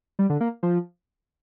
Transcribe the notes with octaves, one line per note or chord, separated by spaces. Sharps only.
G3
D3
A#3
F3